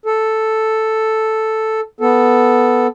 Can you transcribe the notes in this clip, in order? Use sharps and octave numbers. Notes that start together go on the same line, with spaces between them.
A4
B3 A4